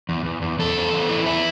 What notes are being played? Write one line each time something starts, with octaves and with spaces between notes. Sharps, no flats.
E2
E2
E2
E2 A4
E2
E2
E3
E2 E4